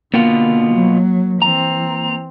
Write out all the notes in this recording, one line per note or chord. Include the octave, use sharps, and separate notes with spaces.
B2 D3 A#3 B3 F4
F#3
E3 C4 A#5